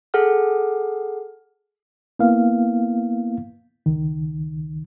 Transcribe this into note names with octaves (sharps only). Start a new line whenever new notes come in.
G#4 A4 F#5 F6
A#3 B3 E4 F5
C#2 D#3